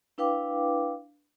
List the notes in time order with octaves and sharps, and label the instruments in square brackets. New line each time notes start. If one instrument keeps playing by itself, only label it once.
[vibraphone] D4 E4 B4 F5 G5 D6